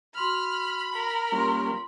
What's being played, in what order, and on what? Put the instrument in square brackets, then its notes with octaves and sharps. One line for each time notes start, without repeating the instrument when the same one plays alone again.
[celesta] F#4 C6 F7 [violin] B5 [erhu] F6
[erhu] A#4
[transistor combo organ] G3 A#3 C#4 [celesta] F4 C6